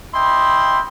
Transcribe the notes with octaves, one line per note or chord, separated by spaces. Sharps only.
E4 D#5 G5 B5 C6